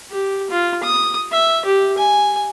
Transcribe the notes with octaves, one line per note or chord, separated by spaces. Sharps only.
G4
F4
D#6
E5
G4
G#5